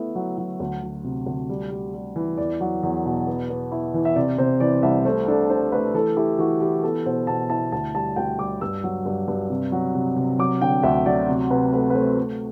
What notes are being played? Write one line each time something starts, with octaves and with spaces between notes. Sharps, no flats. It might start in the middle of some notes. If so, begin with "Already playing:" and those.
Already playing: A3 B3 E4
F#3
F#3
D2
F#3
C3
D2
G3
G3
G3
E3
E2 D5
F#3
E2
B2
B3
B3
E4
E3
E5
C3 D5
C3 C5
E3 D5
C2 E5
A3 C5
D4 A4
D4 C5
A3 B4
E3 A4
E4 G4
E3 F#4
E3 G4
B3 A4
B2 C5
B2 A5
E4 A5
D2 A5
G3 A5
D2 G5
G3 D6
G2 E6
F#3
G2
G2
C3
F#3
C3
C3
F#3 D6
D3 G5
D2 E5
F#3 D5
C3
C3 B4
A3 B4
B4
A3 C5
A3